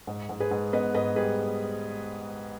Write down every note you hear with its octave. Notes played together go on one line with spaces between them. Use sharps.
G#2
G#2
G#4 B4
G#2
B3 B4 D#5
G#2 B4 D#5
G3 G#4 B4